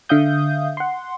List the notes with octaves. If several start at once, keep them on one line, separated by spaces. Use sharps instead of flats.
D3 E5 F5 D#6 G6
F#5 C6